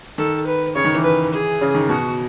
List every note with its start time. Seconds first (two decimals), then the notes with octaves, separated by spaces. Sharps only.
0.18 D#3 A4
0.47 B4
0.75 C#3 C#5
0.85 D#3
0.95 E3
1.04 B4
1.33 G#4
1.61 C#3
1.75 D#3
1.89 B2 F#4